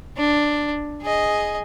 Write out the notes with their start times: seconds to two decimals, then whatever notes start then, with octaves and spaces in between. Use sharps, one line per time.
0.17 D4
1.02 G#4 D#5